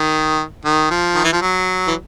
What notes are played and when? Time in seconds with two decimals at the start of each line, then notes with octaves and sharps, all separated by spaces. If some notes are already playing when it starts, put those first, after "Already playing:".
Already playing: D#3
0.65 D#3
0.91 F3
1.15 D#3
1.24 E3
1.33 F3
1.42 F#3
1.87 E3